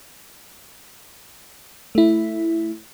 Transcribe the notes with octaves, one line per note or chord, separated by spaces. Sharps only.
A3 E4